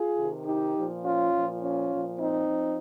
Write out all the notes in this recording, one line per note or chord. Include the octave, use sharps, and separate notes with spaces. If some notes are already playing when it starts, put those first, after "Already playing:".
Already playing: F4 G#4
C3 D#3
D#4 G4
A#2 F3
C#4 F4
A#2 F3
C#4 F4
A#2 F3
C4 D#4
F3